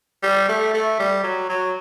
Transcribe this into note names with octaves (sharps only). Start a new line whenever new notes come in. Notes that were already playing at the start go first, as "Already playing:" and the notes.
G3
A3
A3
G3
F#3
F#3